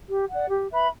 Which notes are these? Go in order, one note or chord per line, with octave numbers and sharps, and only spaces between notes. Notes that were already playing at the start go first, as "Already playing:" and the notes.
G4
D5 F#5
G4
B4 E5 B5